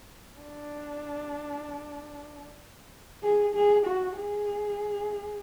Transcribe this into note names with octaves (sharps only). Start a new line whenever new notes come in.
D4
G#4
G#4
F#4
G#4